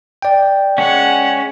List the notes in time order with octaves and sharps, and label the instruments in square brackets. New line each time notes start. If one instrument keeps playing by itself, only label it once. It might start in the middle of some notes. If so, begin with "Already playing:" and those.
[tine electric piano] D5 G5
[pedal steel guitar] G#3 C#4 [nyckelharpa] F#5